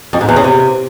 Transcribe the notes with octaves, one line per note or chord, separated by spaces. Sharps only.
F2
G#2
E2
C#3
C3